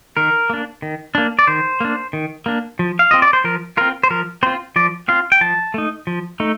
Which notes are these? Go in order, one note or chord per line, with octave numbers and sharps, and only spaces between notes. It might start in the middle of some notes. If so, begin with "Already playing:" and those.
D#3 A#4
A#3 D4
D#3
A#3 D4
D5
D#3 C5
A#3 D4
D#3
A#3 D4
F3
F5
C4 F4 D#5
D5
C5
F3 A#4
C4 F4 A#4
C5
F3 A#4
C4 F4 C5
F3 D5
C4 F4 F5
G5
F3 A5
A3 D#4
F3
A3 D#4